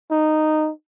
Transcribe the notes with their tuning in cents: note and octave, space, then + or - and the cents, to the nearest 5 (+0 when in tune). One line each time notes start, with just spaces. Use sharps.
D#4 -10